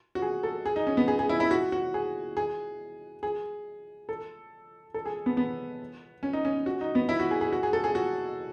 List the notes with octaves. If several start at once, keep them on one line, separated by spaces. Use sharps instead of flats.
F#4
G#4
A4
G#4
D#4
C#4
B3
G#4
G#4
E4
E4
F#4
F#4
G#4
G#4
G#4
A4
A4
G#4
B3
B3
C#4
D#4
C#4
F#4
D#4
B3
E4
F#4
G#4
G#4
F#4
G#4
A4
G#4
F#4